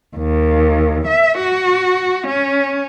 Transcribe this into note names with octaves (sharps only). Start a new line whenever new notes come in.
D#2
E5
F#4
C#4